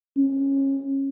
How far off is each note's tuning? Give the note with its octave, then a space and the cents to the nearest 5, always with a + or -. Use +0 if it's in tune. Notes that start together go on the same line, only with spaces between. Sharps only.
C#4 -25